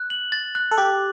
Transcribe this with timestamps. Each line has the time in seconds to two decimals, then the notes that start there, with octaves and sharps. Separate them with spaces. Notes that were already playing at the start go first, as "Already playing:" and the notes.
Already playing: F#6
0.10 F#7
0.32 A6
0.55 F#6
0.71 A4
0.78 G4 D6